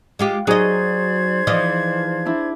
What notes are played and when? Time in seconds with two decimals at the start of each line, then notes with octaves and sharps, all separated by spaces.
0.19 G#3 F4 G4
0.47 F#3 D#4 G#4 C5 D5 D#5 G#6
1.47 E3 F3 D#5
2.26 D4 E4